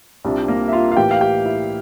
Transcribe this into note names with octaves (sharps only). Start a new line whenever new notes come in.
C2 C3 G3 D4 F4
A#3 A#4
E5
F4 F5
F5
A2 E3 A#3 G4 G5
F5
G4 G5
E4 E5